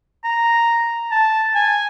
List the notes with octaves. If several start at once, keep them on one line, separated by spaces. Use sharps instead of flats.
A#5
A5
G#5